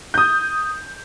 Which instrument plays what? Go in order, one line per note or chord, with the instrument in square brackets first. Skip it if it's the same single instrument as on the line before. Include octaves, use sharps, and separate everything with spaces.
[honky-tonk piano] D#6 G6